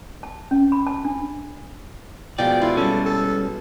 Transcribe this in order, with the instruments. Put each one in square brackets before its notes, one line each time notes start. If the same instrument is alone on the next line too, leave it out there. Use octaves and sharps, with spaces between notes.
[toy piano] A5
C#4
B5
A5
D4
[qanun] B2 F3 G#3 [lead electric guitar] D5 [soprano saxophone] G5
[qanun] E4 [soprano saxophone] F4
[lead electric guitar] G3 C#4 [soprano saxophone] A4
[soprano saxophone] A4